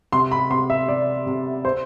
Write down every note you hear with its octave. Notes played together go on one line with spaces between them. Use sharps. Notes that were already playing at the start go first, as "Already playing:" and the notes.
C3 C6
B5
C3 C6
E5
C3 D5
C3
C5